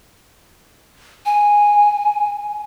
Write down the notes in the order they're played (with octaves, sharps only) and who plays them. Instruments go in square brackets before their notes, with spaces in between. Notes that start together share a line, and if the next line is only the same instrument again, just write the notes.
[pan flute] G#5